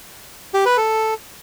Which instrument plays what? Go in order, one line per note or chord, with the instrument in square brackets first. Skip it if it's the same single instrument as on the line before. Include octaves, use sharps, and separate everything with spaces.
[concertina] G4
B4
A4